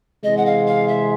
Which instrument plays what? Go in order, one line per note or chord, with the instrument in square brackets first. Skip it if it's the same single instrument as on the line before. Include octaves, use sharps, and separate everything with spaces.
[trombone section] C3 E3 G#3 [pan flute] D#5
[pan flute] F#5
F5
F5
E5